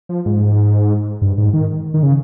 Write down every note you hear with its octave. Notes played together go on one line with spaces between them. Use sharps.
F3
G#2
G2
G#2
D#3
D#3
C#3